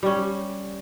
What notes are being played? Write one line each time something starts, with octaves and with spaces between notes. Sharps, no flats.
G3 C#4